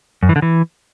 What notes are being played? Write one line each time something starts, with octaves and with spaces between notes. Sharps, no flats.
F#2
E3
D3
E3